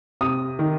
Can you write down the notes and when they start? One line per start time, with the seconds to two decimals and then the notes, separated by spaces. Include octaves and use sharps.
0.21 C3 D#6
0.59 D#3